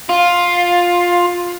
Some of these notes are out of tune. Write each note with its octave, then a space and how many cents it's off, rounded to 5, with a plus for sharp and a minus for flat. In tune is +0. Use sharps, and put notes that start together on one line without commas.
F4 +10